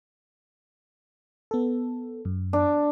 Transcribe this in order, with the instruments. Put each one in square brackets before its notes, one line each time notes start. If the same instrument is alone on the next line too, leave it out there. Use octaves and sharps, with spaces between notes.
[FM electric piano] B3 A4
F#2
[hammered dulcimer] D4